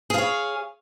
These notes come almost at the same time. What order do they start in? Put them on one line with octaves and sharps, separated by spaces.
G#4 F5 C#5